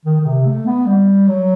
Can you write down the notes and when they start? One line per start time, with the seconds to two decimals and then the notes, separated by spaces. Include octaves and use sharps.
0.05 D#3
0.21 D#3
0.26 C3
0.46 A3
0.66 B3
0.86 G3
1.28 F#3